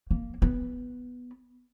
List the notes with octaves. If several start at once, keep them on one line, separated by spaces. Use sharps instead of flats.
A#3
B3